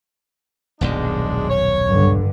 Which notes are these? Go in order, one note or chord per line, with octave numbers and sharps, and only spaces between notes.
D#1 B1 F#2 G#3 D4
C#5
G2 D3